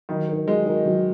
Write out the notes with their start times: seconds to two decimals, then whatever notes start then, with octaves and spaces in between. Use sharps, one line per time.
0.09 D#3 F#3
0.28 D#4 F#4 A#4
0.47 F#3 G#3
0.66 D#4 F#4 A#4
0.85 F#3